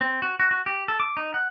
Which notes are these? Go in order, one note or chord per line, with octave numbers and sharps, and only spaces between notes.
C4
F#4
F#4
F#4
G4
A4
D6
D#4
F#5